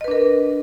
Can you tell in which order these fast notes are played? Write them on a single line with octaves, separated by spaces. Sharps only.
D#5 B4 D4 A#4